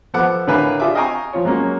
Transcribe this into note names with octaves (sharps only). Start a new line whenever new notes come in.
F3 B3 A4 F#5 B5 D6
A2 D3 A#4 B4 F5 G#5
D4 F4 G#4 E5 D6
D#5 F5 G5 G#5 A#5 C#6
F3 F4 C#5
F#3 G#3 A#3 C#4